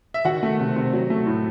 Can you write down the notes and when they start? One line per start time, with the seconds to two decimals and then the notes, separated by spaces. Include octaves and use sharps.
0.14 E5
0.25 D#3 F#4 F#5
0.43 A3
0.60 C3
0.76 C3
0.93 F#3
1.10 A3
1.26 A2